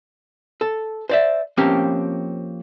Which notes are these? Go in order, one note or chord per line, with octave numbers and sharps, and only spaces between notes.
A4
C5 D5 E5
F3 A#3 C4 C#4 G4